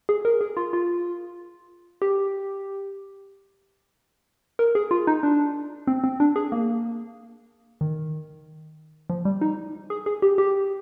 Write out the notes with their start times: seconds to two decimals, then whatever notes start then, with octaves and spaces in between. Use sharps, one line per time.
0.09 G#4
0.25 A#4
0.41 G#4
0.57 F4
0.73 F4
2.02 G4
4.59 A#4
4.75 G#4
4.91 F4
5.07 D#4
5.23 D4
5.87 C4
6.04 C4
6.20 D4
6.36 G#4
6.52 A#3
7.81 D#3
9.10 F3
9.25 G3
9.41 D#4
9.90 G#4
10.06 G#4
10.22 G4
10.38 G4